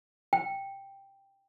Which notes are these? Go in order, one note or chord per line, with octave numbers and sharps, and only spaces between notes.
G5